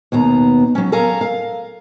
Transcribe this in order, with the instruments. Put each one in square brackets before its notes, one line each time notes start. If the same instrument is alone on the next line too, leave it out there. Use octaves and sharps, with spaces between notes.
[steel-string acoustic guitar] D#2 B2 B3 A#5
F#3 C#4
A4 A#4 F5 G#5 A#5
F5